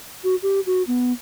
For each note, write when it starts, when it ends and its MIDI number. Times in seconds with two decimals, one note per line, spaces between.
0.24 0.35 66
0.43 0.60 67
0.66 0.83 66
0.87 1.12 59